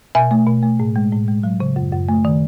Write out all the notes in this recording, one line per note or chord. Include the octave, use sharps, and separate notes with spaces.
B2 E5 G#5
A3
B2
A3
A2
G#3
A2
G#3
F#3
C#3
F#2
F#2
A3
D#3